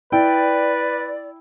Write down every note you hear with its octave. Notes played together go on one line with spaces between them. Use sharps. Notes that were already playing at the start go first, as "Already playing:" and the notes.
E4 B4 D5 G5